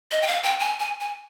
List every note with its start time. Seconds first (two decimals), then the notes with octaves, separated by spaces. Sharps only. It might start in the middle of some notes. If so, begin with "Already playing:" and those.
0.11 D#5
0.22 G5
0.27 F5
0.43 G5
0.60 G#5
0.80 G#5
1.00 G#5